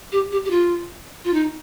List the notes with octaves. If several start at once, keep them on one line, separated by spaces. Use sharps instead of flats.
G4
G4
G4
F4
F4
D#4